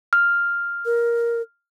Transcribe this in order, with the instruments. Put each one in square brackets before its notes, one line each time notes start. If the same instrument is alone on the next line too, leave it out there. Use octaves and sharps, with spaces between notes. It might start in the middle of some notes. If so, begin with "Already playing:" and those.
[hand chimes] F6
[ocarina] A#4